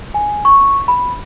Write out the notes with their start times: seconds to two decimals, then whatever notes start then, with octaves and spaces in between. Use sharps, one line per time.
0.14 G#5
0.45 C#6
0.88 B5